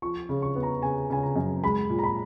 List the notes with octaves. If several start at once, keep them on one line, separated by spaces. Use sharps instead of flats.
F3 C#6
C#3
C#6
B3
A#5
C#3 G#5
C#3 G#5
A#5
F#2
G#3 B5
A#2
A#5
B5